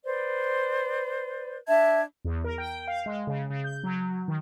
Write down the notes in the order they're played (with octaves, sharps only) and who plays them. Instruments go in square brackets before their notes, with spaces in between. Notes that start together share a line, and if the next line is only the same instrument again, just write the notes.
[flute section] B4 C5 D5
[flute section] D4 A5 G#6 [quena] E5
[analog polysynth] E2
A#4
G5
F5
G#3
C#3
C#3
G6
F#3
D#3